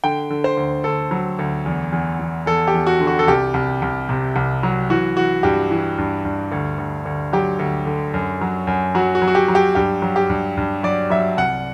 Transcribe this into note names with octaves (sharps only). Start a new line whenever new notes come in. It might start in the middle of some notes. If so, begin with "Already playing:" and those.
D3 G5
D3
C5
D2
D2 A4
F#3
D2
E2
E2
E2
E2 A4
G4
E2
F#4
D3
F#4
A4
C2 G4
C2
C2
C3
C2
F#3
E3 F#4
E3 F#4
G2 G4
E3
G2
G2
D2
D2
D2
F#3 G4
D2
D3
F#2
F#3
F#2
F#3 F#4
F#4
F#3
F#4
G4
F#3
G4
G2 G4
F#3
G4
G2
G2
F#3 D5
F#3 E5
C2 F#5